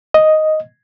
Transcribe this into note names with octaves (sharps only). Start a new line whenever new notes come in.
D#5